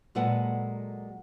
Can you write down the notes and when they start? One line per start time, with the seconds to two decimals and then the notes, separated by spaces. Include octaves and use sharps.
0.15 A#2 F#3 G#3 A4 B4 F#5